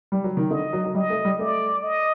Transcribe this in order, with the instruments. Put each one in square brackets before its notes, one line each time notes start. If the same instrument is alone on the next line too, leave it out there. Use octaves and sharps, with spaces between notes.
[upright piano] G3
F#3
D#3
[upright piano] D3 [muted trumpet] D#5
[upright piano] F#3
F#3
[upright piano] G3 [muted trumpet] D#5
[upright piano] A3
G3
[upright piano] A3 [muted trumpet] D5
[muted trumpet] D#5